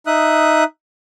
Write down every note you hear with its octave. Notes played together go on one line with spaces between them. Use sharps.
D#4 E5 D#6 F#6